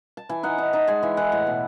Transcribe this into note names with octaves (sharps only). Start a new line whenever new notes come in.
A5
E3 G#5
D#4 F#5
D#4 A5
D#4 A5
G#3 G#5
E3 E5
E3 F#5
A2 G#5
B2